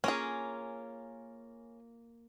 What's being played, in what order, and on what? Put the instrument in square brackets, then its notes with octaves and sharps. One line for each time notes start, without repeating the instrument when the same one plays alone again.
[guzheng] A#3 F4 [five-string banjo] C#4 G#4